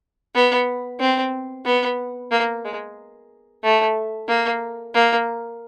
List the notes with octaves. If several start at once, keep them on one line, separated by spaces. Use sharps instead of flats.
B3
C4
B3
A#3
G#3
A3
A#3
A#3